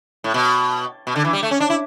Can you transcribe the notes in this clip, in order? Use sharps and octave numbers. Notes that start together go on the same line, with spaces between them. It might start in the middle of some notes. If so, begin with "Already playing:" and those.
A2
B2
B2
D3
E3
G3
A3
C#4
D4
E4